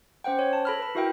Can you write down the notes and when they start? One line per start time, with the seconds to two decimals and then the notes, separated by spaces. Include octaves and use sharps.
0.24 C#4 C5 F#5 G5
0.39 C#5
0.53 A5
0.65 A4 B5 F6
0.80 B4 B5
0.95 E4 F#4 A#4 E5 F#5 G5